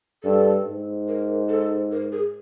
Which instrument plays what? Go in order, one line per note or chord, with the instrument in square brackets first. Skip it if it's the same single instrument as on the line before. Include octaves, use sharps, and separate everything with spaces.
[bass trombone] G2 [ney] A4
[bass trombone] G#2
[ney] A#4
A4
A#4
G#4